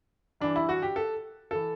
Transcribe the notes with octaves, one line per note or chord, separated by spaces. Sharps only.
G2 E3 D4
E4
F#4
G4
A4
E3 A4